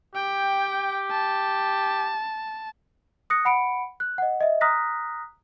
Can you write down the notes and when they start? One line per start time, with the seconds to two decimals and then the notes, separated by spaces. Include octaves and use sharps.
0.16 G4 G5
1.11 A5
3.30 D#6 F#6 A#6 C#7
3.45 F#5 B5 C#7 D7
4.00 F#6
4.18 D#5 F#5
4.41 D#5 E5
4.61 A#5 D#6 F6 F#6 A#6 B6